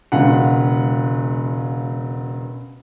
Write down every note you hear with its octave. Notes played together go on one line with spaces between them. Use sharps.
E1 C#2 F5 F#5